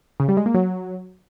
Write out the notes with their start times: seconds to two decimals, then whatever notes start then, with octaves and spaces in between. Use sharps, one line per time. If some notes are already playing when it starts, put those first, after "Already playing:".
0.20 C#3
0.28 G3
0.37 G#3
0.46 A#3
0.54 F#3